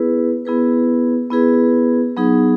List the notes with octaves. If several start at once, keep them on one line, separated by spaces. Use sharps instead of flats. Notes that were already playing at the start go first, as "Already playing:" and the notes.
Already playing: B3 E4 G#4 B4
B3 E4 G#4 B4
B3 E4 G#4 B4
F#3 B3 D#4 G#4